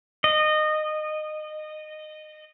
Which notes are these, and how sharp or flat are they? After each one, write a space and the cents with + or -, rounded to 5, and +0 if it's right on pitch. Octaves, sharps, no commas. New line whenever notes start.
D#5 -20